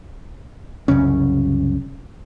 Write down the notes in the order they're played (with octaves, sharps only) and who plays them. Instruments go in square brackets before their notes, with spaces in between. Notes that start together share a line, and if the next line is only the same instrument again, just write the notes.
[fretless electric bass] C2 F#2 C#3 C#4